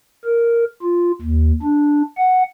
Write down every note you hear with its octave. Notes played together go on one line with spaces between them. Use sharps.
A#4
F4
D#2
D4
F#5